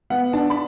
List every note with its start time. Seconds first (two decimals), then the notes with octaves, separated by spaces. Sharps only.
0.10 B3 F#5
0.33 D4 A5
0.50 B5